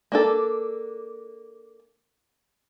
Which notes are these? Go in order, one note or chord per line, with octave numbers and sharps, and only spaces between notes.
A#3 D4 A4